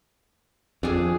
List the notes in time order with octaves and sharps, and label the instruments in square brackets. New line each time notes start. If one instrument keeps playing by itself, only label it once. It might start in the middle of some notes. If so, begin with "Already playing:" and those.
[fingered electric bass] F2 [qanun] D4 G#4